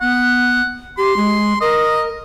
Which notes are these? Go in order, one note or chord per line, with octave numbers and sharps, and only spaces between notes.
B3 F#5
G4 C6
G#3
A#4 D#5